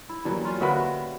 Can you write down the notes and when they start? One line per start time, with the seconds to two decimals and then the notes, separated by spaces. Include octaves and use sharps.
0.09 E4
0.25 E2 F#3 G3 A#3
0.45 G3 C#4 F4
0.61 D2 A#3 F#4 B4 E5 B5